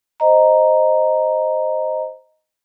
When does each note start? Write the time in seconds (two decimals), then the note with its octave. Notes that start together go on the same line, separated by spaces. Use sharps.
0.20 C5 D#5 A#5